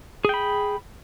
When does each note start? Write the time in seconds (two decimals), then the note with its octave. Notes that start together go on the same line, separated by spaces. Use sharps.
0.25 G#4
0.29 G5
0.34 B5